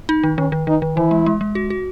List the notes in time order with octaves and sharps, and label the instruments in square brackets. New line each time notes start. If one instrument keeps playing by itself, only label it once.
[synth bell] D#4
D#3
[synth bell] D#3 [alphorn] C#4
[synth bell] D#3
[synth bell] D#3 [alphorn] D#4
[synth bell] D#3
[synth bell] E3 [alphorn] E4
[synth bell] G#3
G#3
G#3
F#4
F#4